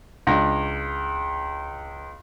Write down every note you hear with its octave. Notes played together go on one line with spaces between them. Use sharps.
C#2 D4 A#6